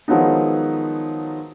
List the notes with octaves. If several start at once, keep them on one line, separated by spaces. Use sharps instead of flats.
D#3 F3 F#3 G#3 B3 D#4